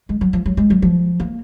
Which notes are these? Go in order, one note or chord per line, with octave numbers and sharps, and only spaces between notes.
G#3
F#3
F3
F#3
G#3
F#3
F3
A#3